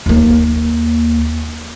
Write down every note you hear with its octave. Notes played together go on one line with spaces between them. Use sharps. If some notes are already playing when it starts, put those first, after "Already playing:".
D#2 A#3